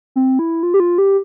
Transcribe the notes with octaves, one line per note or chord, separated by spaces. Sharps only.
C4
E4
F4
G4
F4
G4